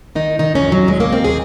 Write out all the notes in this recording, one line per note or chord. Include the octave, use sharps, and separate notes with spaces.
D#3 D#4
D#3 D#4
C#4
F2
F#3
D#2 G#3
A#3
D#2 C4
G#4